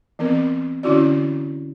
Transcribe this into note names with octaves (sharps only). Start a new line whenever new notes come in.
E3 B3 C4 A#4
D3 C#4 E4 F#4 D5